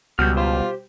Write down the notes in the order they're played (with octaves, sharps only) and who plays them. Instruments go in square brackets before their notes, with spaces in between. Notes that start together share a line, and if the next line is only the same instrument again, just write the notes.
[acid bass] C#2 [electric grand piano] B2 G3 [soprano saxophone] F#4 [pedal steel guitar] F6 G6
[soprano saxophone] F4 [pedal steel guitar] G4 C5